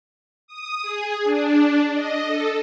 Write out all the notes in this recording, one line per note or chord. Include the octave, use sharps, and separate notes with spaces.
D#6
G#4
D4
D4
D#5
A4